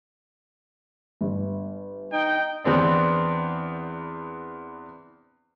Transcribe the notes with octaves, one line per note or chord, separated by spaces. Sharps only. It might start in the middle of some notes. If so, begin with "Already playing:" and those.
G1
D#4 G5
E2 B3 C4 D4